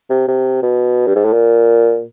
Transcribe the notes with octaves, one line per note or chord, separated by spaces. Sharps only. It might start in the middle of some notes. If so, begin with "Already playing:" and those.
C3
C3
B2
G2
G#2
A2
A#2